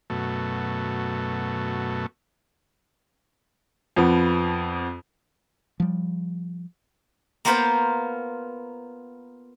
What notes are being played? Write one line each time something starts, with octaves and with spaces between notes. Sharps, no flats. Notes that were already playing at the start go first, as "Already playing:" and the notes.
F#2 B2 A3
F2 F3 B3
F3 G3
A#3 B3 F4 C5 B5